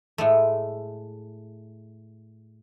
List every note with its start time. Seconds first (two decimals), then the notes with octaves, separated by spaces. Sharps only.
0.18 A2 G#3 A3